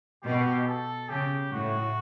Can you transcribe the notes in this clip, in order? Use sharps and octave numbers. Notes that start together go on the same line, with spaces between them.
B2 G4
A4
C#3 G4
A2 F#4